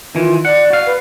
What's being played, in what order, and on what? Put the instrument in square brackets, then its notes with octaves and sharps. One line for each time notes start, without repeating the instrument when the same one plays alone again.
[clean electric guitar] D#3 E3 [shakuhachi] F4
[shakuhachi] D5 [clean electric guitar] F#5
[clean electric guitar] F#4 F5
[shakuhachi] B4